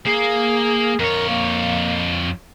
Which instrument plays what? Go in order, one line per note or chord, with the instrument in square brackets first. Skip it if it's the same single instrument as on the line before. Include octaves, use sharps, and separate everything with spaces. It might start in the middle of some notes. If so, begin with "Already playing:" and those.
[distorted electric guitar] A#3 F5 [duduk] G#4
[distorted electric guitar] F2 C#5 [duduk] A#4
[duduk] A#3